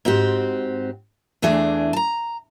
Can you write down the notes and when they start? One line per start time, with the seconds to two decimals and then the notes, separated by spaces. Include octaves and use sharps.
0.05 G#2 C4 F#4 G4
1.42 E2 E3 A3 D4 G#4
1.93 A5 A#5